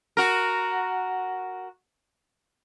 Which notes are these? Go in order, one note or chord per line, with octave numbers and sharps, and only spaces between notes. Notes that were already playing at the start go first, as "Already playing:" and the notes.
F#4 A#4